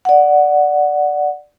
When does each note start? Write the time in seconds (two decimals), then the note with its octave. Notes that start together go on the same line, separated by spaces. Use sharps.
0.05 D5 F#5